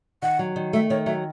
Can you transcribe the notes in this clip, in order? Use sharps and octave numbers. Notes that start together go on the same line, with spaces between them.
D#3 F#5
F#3
D#3
A3 E5
D#3 C#5
F#3 E5